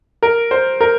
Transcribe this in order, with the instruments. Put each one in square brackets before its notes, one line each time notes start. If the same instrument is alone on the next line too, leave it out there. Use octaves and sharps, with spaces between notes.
[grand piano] A#4
C5
A#4